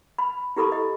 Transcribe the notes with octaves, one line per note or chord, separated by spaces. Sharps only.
B5
E4 G4 A4 B5 D#6
D#5